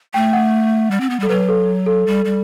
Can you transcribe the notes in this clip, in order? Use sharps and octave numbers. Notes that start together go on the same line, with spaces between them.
A3 G5
F#5
G3
C4
B3
G3 A4
F#3 B4
A4
A4
G3
G3